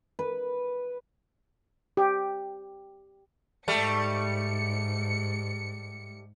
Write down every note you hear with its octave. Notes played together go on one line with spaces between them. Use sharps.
B4
G4
G#2 G3 A3 C#7